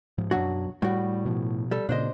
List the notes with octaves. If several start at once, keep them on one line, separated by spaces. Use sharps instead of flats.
G#2 F3
B1 F#2 F#3 D4 F#4
A2 G3 F#4
B2 F3
G3 A4
A#2 C#3 D4 C5 D#5